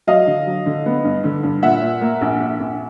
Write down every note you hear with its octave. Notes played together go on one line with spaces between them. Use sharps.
F#3 D#5 F5
D3
F#3
D3
B3
G2
D3
G2
A#2 E5 F#5
A#2
A#3
A#1
A#1
A#1